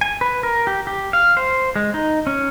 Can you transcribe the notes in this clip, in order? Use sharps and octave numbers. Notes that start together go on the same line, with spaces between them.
G#5
B4
A#4
G4
G4
F5
C5
G#3
D#4
C#4